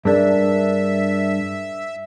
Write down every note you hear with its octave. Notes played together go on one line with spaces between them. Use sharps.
G2 D4 G#4 A#4 D5 E5